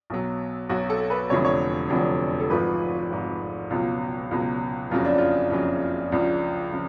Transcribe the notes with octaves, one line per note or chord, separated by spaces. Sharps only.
B1 B2 F#3
B1 B2 F#3 F#4
A4
B4
F1 F2 D3 F#3 C#5
C#5
F1 F2 D3 F#3
A4
G#1 G#2 F3 B4
G#1 G#2 F3
C#2 B2 F#3 F4
C#2 B2 F#3
F#1 F2 C#3 F#3 F4
D4
F4
F#1 F2 C#3 F#3
C#2 C#3 F3 D4
C#3 F3